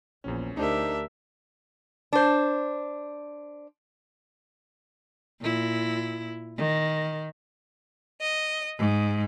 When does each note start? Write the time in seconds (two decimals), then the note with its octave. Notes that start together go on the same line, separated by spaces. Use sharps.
0.24 A#1 E2 C#4
0.57 D2 D4 D#4 G4 A#4 C5 E5
2.13 D4 C5
5.41 A#2 E4
6.57 D#3
8.21 D#5
8.79 G#2